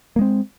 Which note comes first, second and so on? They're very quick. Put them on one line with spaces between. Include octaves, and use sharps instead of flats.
A#3 G#3 C4